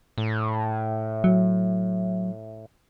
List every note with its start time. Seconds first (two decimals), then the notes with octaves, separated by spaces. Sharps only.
0.18 A2
1.24 F#3